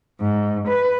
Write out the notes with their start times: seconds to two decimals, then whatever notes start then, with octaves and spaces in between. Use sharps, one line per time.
0.20 G#2
0.68 B4